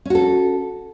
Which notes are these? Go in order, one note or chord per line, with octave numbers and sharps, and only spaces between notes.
C#4 F#4 A4